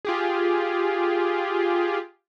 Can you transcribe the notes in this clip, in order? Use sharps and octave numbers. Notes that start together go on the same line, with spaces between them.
F4 G4 G#4